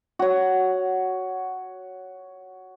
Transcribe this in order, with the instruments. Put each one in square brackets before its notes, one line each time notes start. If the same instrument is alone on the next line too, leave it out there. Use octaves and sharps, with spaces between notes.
[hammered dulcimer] F#4 C#5